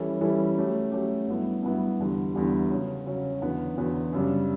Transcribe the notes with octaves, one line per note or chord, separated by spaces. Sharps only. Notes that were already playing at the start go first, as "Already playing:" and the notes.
Already playing: E3 G3 C#4 E4 A4
E3 G3 C#4 E4 A4
F#3 A3 C#4 G4
F#3 A3 C#4 G4
G2 F#3 B3 E4
G2 F#3 B3 E4
E2 D3 G3
E2 D3 G3
C#3 F#3 C#4
C#3 F#3 C#4
E2 D3 F#3 B3
E2 D3 F#3 B3
F#2 C#3 G3 D4